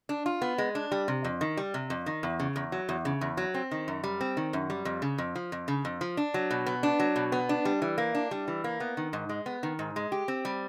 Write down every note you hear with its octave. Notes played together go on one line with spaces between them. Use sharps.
D4
F4
B3
G#3
D4
G3
C3
F2
D#3
G3
C3
F2
D#3
E2
C#3
E2
F#3
E2
C#3
E2
F#3
C4
D#3
F#2
G3
C4
D#3
F#2
G3
F2
C#3
F2
F3
F2
C#3
F2
F3
D4
F#3
B2
B3
D4
F#3
B2
B3
D4
G3
E3
A#3
D4
G3
E3
A#3
B3
D#3
G#2
G#3
B3
D#3
G#2
G#3
G4
C4
G3